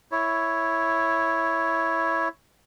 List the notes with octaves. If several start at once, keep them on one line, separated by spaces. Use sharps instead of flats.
E4 C#5